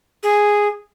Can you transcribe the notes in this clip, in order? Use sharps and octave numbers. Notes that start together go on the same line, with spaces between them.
G#4